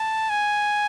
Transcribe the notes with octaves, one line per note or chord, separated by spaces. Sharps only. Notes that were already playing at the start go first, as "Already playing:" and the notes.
Already playing: A5
G#5